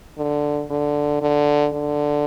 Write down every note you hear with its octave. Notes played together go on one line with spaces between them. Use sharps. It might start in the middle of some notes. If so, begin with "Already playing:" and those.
D3
D3
D3
D3